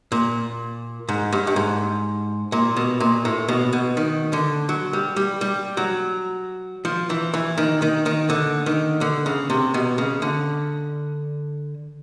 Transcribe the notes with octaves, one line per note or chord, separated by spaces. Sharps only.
A#2
G#2
G2
G2
G#2
A#2
B2
A#2
A2
B2
B2
D#3
D3
F#3
G3
G3
G3
F#3
F3
E3
E3
D#3
D#3
D#3
D3
D#3
D3
C#3
C3
B2
C#3
D3